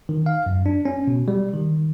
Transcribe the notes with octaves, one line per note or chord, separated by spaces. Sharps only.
D#3
F5
F#2
D4
C#4
B2
G3
D#3